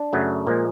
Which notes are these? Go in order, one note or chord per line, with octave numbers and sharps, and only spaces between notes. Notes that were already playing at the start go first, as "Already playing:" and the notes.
Already playing: D4
F#2 C#3 F#3 A3
A#2 F3 G#3 A#3